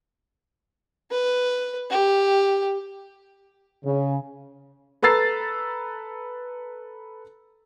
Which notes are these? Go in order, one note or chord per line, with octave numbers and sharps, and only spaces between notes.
B4
G4
C#3
A4 B4 A#5 E6 A6 C7